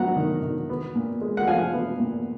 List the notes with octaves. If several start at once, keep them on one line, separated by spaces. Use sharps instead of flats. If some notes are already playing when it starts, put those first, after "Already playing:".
Already playing: F#3 B3 F#5 A#5
D#3
D#3
B3
A#2
G#3
F#5
F3 F5 G#5
B3
A#2